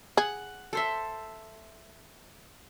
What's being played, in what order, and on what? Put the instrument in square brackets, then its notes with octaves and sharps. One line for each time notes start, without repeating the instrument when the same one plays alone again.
[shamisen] G#4 [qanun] F#5
[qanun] A4 C5 E5